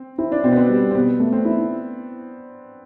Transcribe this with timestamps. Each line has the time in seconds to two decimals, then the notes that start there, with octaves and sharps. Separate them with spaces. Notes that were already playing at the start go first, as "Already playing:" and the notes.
Already playing: C4
0.18 C4 E4
0.32 D4
0.44 B2 C4
0.52 B3
0.57 C4
0.69 G3
0.91 C4
0.95 B2 B3
1.20 A3
1.33 C4
1.45 E4